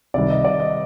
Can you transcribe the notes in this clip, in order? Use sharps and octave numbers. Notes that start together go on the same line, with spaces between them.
C3 D#3 G3 D5
D#5
D5
D#5